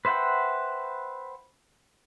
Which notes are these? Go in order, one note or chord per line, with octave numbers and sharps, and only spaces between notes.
B4 C5 E5 F#5 G5